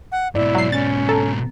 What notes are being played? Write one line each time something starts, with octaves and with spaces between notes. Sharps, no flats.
F#5
G#2 B2 E4 D5
F#3 C7
C#4 A6
A4 A#5